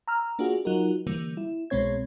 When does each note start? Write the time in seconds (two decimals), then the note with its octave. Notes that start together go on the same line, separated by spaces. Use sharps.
0.08 A#5 E6 F6
0.39 A#3 D4 F4 F#4 G#4
0.65 F#3 D#4 F4 F#4 A#4
1.07 D3 E3 G3 A#3
1.37 E4
1.70 B1 B2 G#3 C4 C#5 G#6